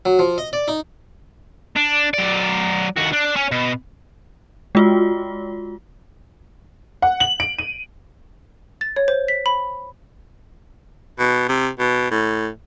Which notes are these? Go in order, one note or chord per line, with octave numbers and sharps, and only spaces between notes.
F#3
F3
D#5
D5
D#4
D4
F#3 D5
D#2 F#4
D4
C#4
B2
G#3 F4 F#4
F#5
F#7
D7
D#7
A6
C#5
C5
B6
B5
B2
C3
B2
A2